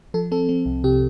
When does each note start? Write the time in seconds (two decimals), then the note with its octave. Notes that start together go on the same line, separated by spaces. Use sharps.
0.14 F3 A4
0.31 C4 A4
0.49 C4
0.66 C2
0.84 C3 G4